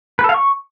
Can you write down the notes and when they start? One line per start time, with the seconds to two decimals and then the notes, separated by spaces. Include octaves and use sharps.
0.19 B4
0.24 A4
0.29 F5
0.34 C#6